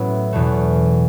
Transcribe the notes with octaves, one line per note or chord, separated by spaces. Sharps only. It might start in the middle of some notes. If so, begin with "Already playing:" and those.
Already playing: A2 F#3 B3 C#4 E4
E2 B2 A3